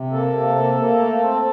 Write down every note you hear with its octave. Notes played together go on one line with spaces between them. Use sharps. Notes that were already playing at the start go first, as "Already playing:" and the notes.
Already playing: C3
A#3 A4
C3
A#3
A#3
A3
C4